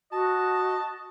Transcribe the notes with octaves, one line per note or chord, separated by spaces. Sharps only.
F#4 D#5 A5